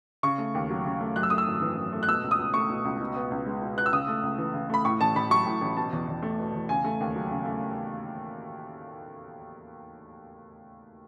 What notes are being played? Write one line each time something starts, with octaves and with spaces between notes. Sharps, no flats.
C#3 C#6
A3
D#2
F#3
C#3
A3
F#2 F#6
E6
A3 D#6
E6
G#1
E3
F#2
A3
F#6
B2 E6
C#2
D#6
C#2
A3 C#6
B2
C#2
B2
B3
C#2
G#3
B2
B3 F#6
E6
C#3 D#6
A3
C#2
E3
C#3
A3 B5
A2 C#6
A1 A5
A1 B5
F#3 C#6
A2
A1
B2 A5
E2
E2
A3
B2
E2
C#3 G#5
A3
D#2
F#3
C#3
A3